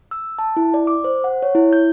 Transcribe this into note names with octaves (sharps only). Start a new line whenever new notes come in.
E6
A5
E4
D5
D6
C5
F#5
C#5
E4
G6